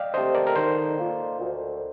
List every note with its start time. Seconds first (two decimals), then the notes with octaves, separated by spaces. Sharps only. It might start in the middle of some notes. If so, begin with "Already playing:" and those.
Already playing: D5 D#5 F5 G5
0.14 D3 A3 C4 G4 C5 D#5
0.35 A#4 D5
0.47 A#4
0.55 D#3 A4 C5
0.98 A#3 F4
1.39 D2